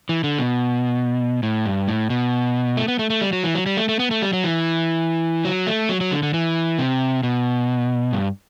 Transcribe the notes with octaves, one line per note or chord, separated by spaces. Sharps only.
E3
D3
B2
A2
G2
A2
B2
A3
B3
A3
A3
G3
F#3
E3
F#3
G3
A3
A3
B3
A3
G3
F#3
E3
F#3
A3
F#3
F#3
D3
D3
E3
C3
B2
G2